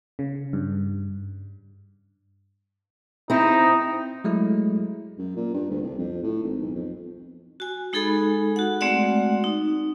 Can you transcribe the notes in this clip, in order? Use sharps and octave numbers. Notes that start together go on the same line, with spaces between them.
C#3
G2
C4 D#4 E4
F#3 G#3 A3 E4
F#2
A#2
G2
D2
C2
F2
A2
G#1
B1
F2
F#4 G#5
G#3 D#4 G#4 A4 G#5 B5
F#4 F#5
G#3 A3 C4 F#4 D5 F#5
D#4